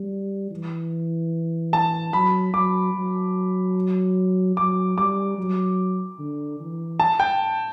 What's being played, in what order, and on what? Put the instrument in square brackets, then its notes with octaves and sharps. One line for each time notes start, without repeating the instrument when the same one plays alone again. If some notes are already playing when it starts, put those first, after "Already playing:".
Already playing: [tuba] G3
E3
[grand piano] A5
[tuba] F#3 [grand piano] B5
[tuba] F#3 [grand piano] D6
[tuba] F#3
[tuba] F#3 [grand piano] D6
[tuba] G3 [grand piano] D6
[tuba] F#3
D3
E3
[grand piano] A5
G5